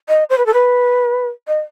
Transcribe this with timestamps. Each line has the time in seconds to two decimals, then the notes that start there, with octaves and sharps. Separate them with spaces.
0.09 D#5
0.30 C5
0.38 B4
0.46 A4
0.54 B4
1.48 D#5